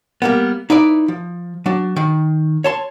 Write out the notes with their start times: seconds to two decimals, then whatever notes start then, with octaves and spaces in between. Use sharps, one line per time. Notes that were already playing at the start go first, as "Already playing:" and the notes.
0.22 G3 A#3 B3
0.70 D#4 E4 B4 D5
1.08 F3
1.66 F#3 D4
1.96 D#3
2.64 C#5 A5 C6